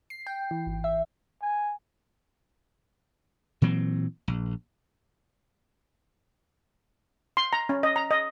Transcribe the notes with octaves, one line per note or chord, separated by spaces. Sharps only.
C7
G5
E3
G#1
E5
G#5
A#2 E3 F#3 C4
A#1
C6
A#5
C#4
D#5
A#5
D#5